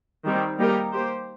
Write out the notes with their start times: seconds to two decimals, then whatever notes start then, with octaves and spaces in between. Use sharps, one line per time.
0.25 D#3 G3 C4
0.58 G3 A#3 D#4 G4 A#4
0.93 A#3 G4 C5